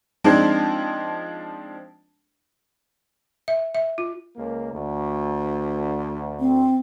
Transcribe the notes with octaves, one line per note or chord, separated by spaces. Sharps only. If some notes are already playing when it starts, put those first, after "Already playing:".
F3 G#3 C4 D4 D#4
E5
E5
F4
C#2 A#3
D2
C4